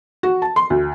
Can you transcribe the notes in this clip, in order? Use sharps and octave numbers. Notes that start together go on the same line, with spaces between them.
F#4
A5
C6
D2